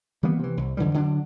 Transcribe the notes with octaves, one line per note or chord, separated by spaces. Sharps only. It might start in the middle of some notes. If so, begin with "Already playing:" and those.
E3 G3 A#3 B3
C3 E3
C2
F2 D3 E3 G3
D3 F#3 C#4 D4